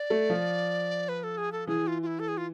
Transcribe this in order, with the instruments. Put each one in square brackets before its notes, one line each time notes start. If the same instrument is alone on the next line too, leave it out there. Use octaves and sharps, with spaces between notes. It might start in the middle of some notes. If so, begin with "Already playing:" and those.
Already playing: [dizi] D5
[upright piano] A3
F3
[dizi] B4
A4
G#4
A4
[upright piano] E3 [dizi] G#4
[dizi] F4
F4
E4
A4
G#4
F4